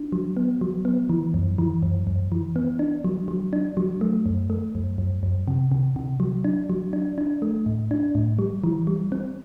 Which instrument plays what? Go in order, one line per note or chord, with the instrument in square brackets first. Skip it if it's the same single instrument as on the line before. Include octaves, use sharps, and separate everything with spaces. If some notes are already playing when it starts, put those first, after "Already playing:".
Already playing: [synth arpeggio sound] D4
F#3
B3
F#3
B3
E3
F#2
E3
F#2
F#2
E3
B3
D4
F#3
F#3
D4
F#3
A3
F#2
A3
F#2
F#2
F#2
C3
C3
C3
F#3
D4
F#3
D4
D4
A3
A2
D4
A2
G3
E3
G3
C4